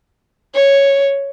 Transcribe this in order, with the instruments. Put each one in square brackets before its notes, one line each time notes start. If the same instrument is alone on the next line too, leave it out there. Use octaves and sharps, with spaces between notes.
[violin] C#5